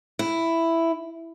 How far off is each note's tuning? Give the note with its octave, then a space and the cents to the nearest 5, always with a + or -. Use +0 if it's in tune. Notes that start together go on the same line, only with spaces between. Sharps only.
E4 +5